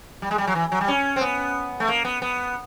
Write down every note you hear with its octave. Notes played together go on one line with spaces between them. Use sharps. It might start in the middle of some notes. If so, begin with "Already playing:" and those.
G3
G#3
G3
F#3
E3
F#3
G3
C#4
C4
B3
A3
A#3
B3
B3